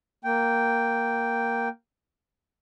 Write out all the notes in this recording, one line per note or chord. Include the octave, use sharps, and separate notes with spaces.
A#3 G5